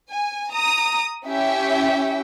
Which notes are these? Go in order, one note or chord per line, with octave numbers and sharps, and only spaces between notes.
G#5
A#5 D#6
C#4 E4 G4 E5 G5